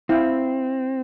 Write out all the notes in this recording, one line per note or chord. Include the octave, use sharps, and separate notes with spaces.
C4 E4 F5 G5